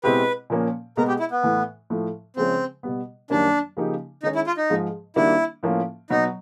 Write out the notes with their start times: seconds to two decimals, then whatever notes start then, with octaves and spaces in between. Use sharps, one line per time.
0.04 B2 G#3 C4 E4 G4 B4
0.50 A#2 F3 A#3 C#4
0.97 B2 G#3 B3 A#4
1.08 G4
1.20 E4
1.31 B3
1.43 A2 E3 A3
1.90 A2 F3 A3
2.36 C#3 F3 G#3 C4 C#4
2.83 B2 G3 B3
3.30 F#2 D#3 G3 A#3 C#4 D4
3.77 C#3 F3 A#3 D#4 G4
4.23 D#3 G#3 C#4 D#4
4.35 E4
4.47 F4
4.57 D#4
4.70 G#2 F3 G#3
5.16 D#3 G3 A#3 D4 E4 F#4
5.63 A2 F3 A#3 C#4 F4
6.10 B2 F#3 B3 D#4